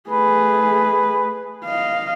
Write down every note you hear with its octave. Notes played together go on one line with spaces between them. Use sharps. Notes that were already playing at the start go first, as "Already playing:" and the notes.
A3 G#4 B4
D#5 F5